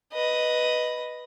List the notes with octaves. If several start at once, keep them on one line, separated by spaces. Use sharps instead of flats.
B4 D#5